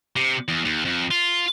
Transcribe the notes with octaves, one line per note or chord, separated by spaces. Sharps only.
C3
E2
D#2
F2
F4